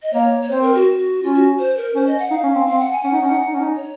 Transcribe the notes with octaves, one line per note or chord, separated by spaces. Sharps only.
D#5
A#3 C#5
C#5
C4 C5
A#4
F#4
C#4 F4
F#4
C5
A#4
C#4 C5
D#5
F#5
D#4 F5
C#4
C4
C4 F5
F#5
G#5
C#4 F#5
D#4
C#4
D#4
D#4
C#4
D#4
C#5